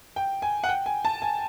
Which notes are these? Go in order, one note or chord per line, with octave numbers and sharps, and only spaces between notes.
G5
G#5
F#5
G5
G#5
A5
G#5